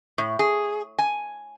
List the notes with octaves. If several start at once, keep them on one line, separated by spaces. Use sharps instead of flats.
A2
G#4
G#5